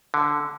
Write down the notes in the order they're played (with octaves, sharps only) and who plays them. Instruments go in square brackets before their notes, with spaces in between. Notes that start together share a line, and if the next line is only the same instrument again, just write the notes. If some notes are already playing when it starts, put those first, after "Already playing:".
[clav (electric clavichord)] D3